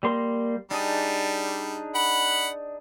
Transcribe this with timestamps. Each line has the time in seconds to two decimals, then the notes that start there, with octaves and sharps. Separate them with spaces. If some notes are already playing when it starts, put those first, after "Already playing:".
0.03 G3 A#3 C6
0.71 G3 D4 D#4 G#4
1.95 F#5 B5